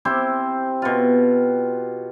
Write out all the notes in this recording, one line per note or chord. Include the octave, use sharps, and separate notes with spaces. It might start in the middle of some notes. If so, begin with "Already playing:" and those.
C4 E4 G4 C5
B2 F4